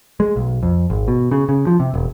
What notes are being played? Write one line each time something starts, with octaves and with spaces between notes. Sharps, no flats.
G#3
B1
F2
G#1
B2
C#3
C#3
F3
C3
E1